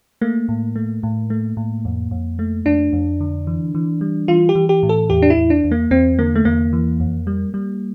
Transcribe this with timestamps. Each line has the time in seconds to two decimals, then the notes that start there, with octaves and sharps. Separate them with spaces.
0.21 A3 A#3
0.49 A2
0.76 A3
1.03 A2
1.30 A3
1.57 A2
1.85 F2
2.11 F2
2.39 A3
2.66 F2 D4
2.93 F2
3.21 D3
3.47 E3
3.75 E3
4.01 G3
4.28 E3 F4
4.49 G4
4.55 E3
4.69 G4
4.83 A2
4.89 A4
5.10 E2 G4
5.22 D4
5.30 E4
5.37 E2
5.50 D4
5.64 E2
5.72 A#3
5.91 E2 C4
6.19 D3 A#3
6.35 A3
6.45 E2 A#3
6.73 E3
7.00 F2
7.27 G3
7.54 G3